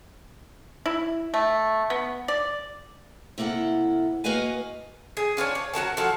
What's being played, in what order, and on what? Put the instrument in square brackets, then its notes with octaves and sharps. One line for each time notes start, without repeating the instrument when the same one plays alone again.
[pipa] E4
A3
B3
D5
[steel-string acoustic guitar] C3 A#3 E4 A4 F#5
A#3 F#4 B4 D#5 F5 G#5
[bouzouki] G#4
D4 F4 G#4 C#5
C#5
F#3 F#4 A#4 A5
F3 F#4 A4